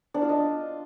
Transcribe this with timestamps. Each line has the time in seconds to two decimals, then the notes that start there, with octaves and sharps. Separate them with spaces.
0.14 D4
0.22 F4
0.29 D#5